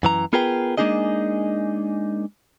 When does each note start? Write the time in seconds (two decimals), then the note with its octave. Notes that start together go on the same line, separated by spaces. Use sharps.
0.03 F#2 E3 A#5
0.33 B3 F4 G#4 A#4 B4 G5
0.78 G#3 A#3 D4 D#4 G#4 D#5